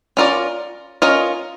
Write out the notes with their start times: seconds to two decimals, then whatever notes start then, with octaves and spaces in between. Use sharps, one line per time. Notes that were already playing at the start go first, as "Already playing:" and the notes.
0.17 C#4 F4 A#4 D5
1.02 C#4 F4 A#4 D#5